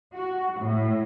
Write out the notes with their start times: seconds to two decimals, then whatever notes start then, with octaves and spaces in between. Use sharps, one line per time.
0.15 F#4
0.59 A2